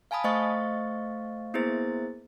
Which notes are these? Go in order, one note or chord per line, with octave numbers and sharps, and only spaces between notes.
F5 G#5 A5 B5 D#6
A3 C5 D#5 F5 C#6 A6
A#3 B3 E4 G#4 C5 A6